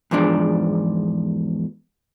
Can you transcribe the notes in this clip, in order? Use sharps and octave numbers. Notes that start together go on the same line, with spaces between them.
E2 G#2 F3 D4